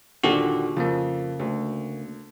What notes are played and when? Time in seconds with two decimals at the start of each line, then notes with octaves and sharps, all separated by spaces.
0.23 D#2 A#2 D3 F#4 G4
0.77 F2 C#3 A#3
1.39 D2